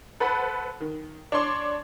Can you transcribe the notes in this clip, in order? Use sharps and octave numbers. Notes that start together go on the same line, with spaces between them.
A4 B4 C5 F#5 B5
D#3
D4 C#5 C6 D6